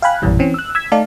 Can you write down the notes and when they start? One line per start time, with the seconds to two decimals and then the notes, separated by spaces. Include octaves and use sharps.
0.02 F5 G5 G#5 B5 F#6
0.22 A#1 F#2 B2 E3 G3
0.39 E3 C4 C#4
0.54 E6 F#6
0.75 E6 G#6 B6
0.92 A3 D#4 D5 F5 A5